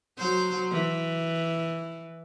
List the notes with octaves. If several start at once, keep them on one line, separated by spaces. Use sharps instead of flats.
F#3 C5
E3